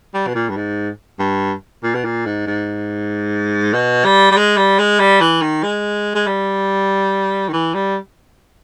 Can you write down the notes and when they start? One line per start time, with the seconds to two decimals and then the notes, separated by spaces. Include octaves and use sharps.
0.14 G3
0.27 B2
0.35 A#2
0.49 G2
0.56 G#2
1.19 G2
1.83 A#2
1.95 B2
2.04 A#2
2.26 G#2
2.46 G#2
3.73 B2
4.05 G3
4.31 G3
4.37 G#3
4.57 G3
4.79 G#3
5.00 G3
5.21 E3
5.42 D#3
5.63 G#3
6.15 G#3
6.26 G3
7.48 D#3
7.53 E3
7.74 G3